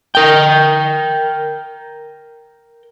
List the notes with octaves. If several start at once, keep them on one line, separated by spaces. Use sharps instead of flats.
A#4 G5